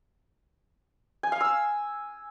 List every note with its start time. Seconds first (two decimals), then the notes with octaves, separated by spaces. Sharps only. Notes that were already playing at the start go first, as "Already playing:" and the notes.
1.23 G#5
1.32 F5
1.41 E6